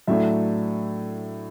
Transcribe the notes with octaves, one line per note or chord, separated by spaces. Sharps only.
A2 F#3 A3 D4 E5